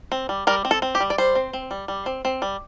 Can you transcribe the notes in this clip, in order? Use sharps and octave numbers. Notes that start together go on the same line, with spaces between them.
C4
G3
G3 A#4
C4
A4
C4
G4
G3
D5
G3 C5
C4
C4
G3
G3
C4
C4
G3